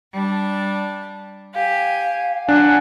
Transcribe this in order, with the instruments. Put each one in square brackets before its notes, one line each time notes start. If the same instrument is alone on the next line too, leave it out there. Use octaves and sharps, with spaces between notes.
[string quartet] G3 D4 A5
[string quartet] G4 G#5 [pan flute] F5
[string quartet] F#3 [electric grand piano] D4 [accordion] F#5 G#5